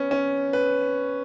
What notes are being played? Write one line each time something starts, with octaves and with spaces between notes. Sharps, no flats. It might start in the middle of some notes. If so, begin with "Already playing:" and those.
Already playing: B3 C#4
C#4
B4